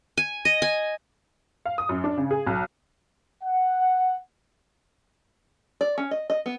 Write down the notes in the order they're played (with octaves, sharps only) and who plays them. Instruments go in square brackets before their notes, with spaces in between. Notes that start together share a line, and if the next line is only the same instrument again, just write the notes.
[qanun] G#5
D#5
G#5
[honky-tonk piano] F5
D#6
F#2
D4
C#3
G#4
B1
[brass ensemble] F#5
[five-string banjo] D5
C#4
D#5
D#5
B3